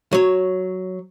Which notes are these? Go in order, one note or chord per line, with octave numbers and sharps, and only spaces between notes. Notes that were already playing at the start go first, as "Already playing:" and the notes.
F#3 C#5